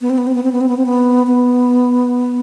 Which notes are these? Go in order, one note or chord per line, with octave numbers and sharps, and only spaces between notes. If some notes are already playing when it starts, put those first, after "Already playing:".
B3
C4
B3
C4
B3
C4
B3
C4
B3
C4
B3
B3